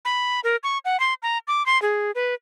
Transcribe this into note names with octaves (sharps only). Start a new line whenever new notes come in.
B5
A#4
C#6
F#5
C6
A#5
D6
C6
G#4
B4